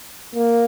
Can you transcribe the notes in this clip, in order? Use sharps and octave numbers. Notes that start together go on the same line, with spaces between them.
A#3